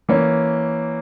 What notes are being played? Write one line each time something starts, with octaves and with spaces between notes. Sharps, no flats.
E3 A#3 C#4